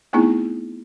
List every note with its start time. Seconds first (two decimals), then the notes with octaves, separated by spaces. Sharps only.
0.13 A3 B3 C4 D#4 E4 G#4